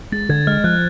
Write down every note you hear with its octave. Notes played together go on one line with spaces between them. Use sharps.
G#3 A6
D3 G#6
G#3 F6
F3 F#6